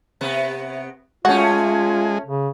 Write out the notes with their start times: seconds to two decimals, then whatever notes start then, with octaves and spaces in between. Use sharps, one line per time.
0.21 C3 B3
1.25 G#3 A3 C#4 F4 F#4
2.26 C#3